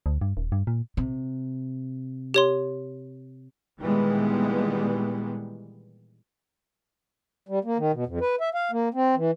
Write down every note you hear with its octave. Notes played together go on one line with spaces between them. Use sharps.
D2
G2
D#1
G2
A#2
C3
G4 C#5 C6
A#2 D#3 E3 G3 G#3 B3
G3
A#3
D#3
B2
F2
B4
E5
F5
A#3
C4
E3